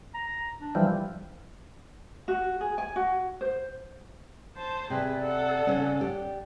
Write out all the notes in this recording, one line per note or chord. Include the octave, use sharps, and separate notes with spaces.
A#5
D4
E3 F3 G3
F#4
G#4
G#5
F#4
C5
C5 A5
C3 G#4 B4 D5
A4 F#5
C#3 C#4
G4